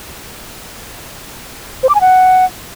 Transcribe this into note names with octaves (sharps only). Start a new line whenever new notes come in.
C5
D6
G#5
F#5